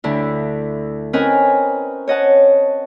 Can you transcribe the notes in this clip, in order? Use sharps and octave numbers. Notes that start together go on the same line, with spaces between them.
D2 D3 E4
C4 C#4 A#4 B4 D#5 G#5
C#5 D#5 F#5 A5